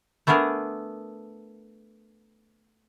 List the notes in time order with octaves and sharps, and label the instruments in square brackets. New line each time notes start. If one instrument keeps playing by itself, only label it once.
[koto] A3 B3 D4 G#4 A#4